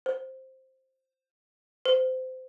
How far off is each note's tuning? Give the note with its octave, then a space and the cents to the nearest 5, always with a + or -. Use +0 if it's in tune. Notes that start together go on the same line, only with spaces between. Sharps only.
C5 +5
C5 -25